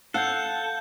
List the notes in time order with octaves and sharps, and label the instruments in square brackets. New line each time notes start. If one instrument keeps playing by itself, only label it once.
[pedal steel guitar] A4 [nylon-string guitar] F5 F#5 [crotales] F#6 G6